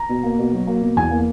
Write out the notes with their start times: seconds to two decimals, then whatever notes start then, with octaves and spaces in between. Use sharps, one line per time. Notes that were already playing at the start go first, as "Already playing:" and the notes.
Already playing: A#5
0.09 B2
0.24 A#3
0.39 B2
0.52 F#3
0.67 A#3
0.81 B2
0.97 E2 G#5
1.11 A#3